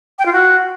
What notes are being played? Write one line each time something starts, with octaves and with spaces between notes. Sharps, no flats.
G5
F4
F#4